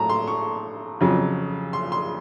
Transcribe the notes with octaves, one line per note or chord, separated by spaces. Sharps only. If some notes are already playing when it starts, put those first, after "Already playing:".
Already playing: A2 F#3 A5 A#5
C6
C#6
F2 C#3 F#3
C6
C6